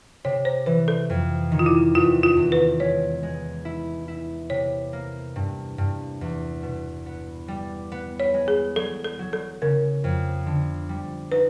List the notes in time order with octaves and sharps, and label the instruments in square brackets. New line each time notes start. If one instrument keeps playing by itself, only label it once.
[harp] C3 [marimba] C#5
[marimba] C5
[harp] E3 [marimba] B4
[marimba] A4
[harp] F2
D#3
[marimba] F4
E4
[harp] E2 [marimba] F4
[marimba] F4
[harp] E2
[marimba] B4
[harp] G#3 [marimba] C#5
[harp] G#3
E4
E4
[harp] C3 [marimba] C#5
[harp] A#3
G2
G2
E2
B2
B3
G3
B3
[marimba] C#5
[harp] G#3
[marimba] G#4
[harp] F#3 [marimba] A4
[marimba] A4
[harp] F#3
[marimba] A4
[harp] C#3 [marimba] A#4
[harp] F2
D3
G3
[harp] D#4 [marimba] B4